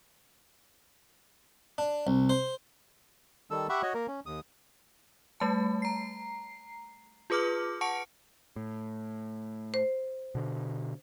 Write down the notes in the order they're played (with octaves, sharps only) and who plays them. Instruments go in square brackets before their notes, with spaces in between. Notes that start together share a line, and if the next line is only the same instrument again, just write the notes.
[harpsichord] D4
C2
C5
[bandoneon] D#3 G3 A4 E6
G4 E5 F#5 B5 C#6
F#4 C#5 D#5
A#3 A#4
C#4
D#2 D#6
[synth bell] G3 A3 A5
A#5 C7
F4 G#4 B4 D6 F6
F#5 A5 C#6 C#7 D7
[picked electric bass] A2
[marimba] C5
[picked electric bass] B2 D3